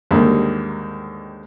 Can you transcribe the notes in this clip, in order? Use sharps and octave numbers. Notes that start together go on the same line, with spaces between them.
D#2 G#2 D3 G3 A#3